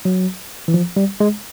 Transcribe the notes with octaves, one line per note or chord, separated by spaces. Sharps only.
F#3
E3
F3
G3
G#3